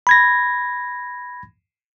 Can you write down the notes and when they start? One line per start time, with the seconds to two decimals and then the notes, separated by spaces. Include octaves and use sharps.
0.07 B5 G#6 A#6